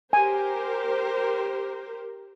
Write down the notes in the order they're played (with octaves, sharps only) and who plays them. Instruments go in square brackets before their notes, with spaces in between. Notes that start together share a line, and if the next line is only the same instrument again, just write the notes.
[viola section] G4 A#4 C5 [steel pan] G#5